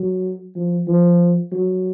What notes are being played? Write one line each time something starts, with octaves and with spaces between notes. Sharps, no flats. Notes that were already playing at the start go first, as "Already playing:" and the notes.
Already playing: F#3
F3
F3
F#3